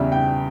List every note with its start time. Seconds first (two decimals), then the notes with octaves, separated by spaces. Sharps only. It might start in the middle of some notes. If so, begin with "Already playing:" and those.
Already playing: E2 C#3 E3 G3 E5
0.12 G5